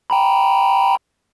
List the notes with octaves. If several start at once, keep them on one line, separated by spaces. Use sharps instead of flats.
G5 A#5 B5